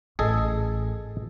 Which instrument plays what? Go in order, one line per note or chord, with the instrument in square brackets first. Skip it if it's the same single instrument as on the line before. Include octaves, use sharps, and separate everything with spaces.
[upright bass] A1 [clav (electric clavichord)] G#4 A4 D#5